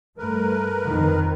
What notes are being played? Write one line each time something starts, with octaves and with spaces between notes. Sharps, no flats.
G2 A3 A#4 B4
F2 D#3